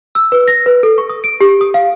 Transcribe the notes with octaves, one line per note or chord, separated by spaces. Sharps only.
E6
B4
A#6
B4
A4
C#6
D#6
D7
G4
D#6
F5